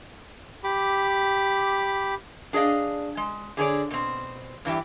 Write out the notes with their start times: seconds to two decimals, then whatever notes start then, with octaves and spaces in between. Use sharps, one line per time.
0.64 G4 B5 D6
2.53 D4 G#4 D5 D#5 F5
3.17 G#3
3.57 D3 G#4 C#5 D5
3.91 B2 C4
4.65 G2 E3 E4 G4